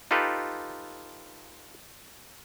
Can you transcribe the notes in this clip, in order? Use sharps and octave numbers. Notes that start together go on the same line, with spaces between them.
D#4 F4 G4 A4 B4